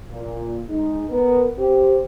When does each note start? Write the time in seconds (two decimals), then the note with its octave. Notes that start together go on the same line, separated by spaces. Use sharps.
0.11 A#2
0.69 G#3 D#4
1.09 B3 A#4
1.57 C4 G4